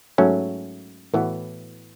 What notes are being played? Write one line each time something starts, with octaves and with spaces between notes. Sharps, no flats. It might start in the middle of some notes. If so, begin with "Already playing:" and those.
G#2 F#3 A3 C#4
A2 E3 B3 F#4